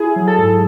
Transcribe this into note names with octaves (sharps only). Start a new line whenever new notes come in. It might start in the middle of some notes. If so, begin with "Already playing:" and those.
Already playing: E4 G#4
F#3
A4
G#2